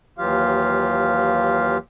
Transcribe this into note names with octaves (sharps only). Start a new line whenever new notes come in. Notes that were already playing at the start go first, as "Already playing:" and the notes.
D#2 E3 F#3 F4 G4 F5